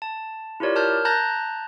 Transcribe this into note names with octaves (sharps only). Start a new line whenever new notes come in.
A5
E4 F4 G4 A#4 C#5 D5
A#4 A5 F6 G6
A5 A#5 F#6 G6 A6 A#6